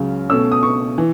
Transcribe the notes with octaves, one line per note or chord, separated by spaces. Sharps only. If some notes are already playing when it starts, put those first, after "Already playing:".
Already playing: C#2 C#3 F#3
B2 A3 C#4 E6
D#6
C#6
E3